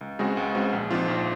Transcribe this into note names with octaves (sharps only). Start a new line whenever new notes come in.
C#2
C#3 G#3 C4 F#4
C#2
C#3 G#3 C4 F#4
A#1
G#2 F3 C4 F4
A#1